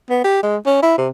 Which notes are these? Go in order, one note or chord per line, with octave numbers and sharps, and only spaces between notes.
B3
G4
G#3
C#4
E4
C3